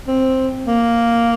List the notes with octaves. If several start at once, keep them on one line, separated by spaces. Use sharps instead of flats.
C4
A#3